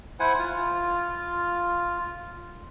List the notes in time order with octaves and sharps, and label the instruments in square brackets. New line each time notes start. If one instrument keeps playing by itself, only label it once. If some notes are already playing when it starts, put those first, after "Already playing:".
[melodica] E4 C5 F#5 G#5
F4